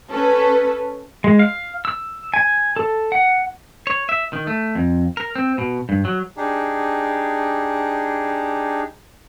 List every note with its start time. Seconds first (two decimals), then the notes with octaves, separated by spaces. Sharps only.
0.10 C#4 A4 B4
1.24 G#3
1.39 F5
1.85 E6
2.34 G#5
2.76 A4
3.12 F#5
3.87 C#5
4.09 E5
4.33 D#3
4.47 A3
4.75 F2
5.17 A#4
5.35 C4
5.58 B2
5.89 G2
6.05 F#3
6.37 D4 D#4 G4 G#4